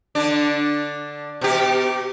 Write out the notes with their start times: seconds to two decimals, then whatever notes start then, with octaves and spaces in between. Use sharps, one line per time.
0.15 D3 D4
1.41 B2 G4